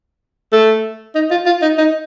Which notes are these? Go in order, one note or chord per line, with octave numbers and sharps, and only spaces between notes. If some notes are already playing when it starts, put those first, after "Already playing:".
A3
D#4
F4
F4
D#4
D#4